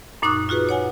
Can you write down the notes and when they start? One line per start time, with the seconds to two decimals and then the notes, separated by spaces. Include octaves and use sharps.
0.22 F#2 A#2 D#4 C#6 D#6 F#6
0.49 F4 F#4 G#4 B4
0.69 C#5 F#5 G#5